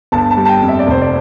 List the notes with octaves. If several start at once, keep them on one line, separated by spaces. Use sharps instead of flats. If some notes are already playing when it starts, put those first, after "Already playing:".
G1 A5
A5
G3
A5
G5
F2
E5
D5
F1 C5
D5